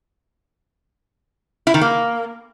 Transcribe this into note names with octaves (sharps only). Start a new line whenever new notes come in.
E4
D#3
A#3